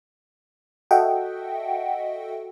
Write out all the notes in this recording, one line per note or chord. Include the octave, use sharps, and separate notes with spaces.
F#4 A4 D#5 E5 F#5 G5